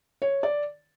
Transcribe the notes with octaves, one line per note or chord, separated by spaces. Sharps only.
C#5
D5